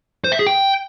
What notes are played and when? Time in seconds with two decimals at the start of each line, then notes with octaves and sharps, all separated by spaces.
0.24 C5
0.32 E5
0.39 G#4
0.47 G5